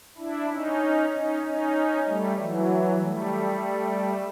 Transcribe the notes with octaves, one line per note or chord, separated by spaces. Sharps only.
D4 E4
C#4 D#4
C#4 D#4
C#4 D#4
G3 A3
E3 F#3
G3 A3